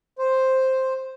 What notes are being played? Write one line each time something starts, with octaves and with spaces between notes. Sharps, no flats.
C5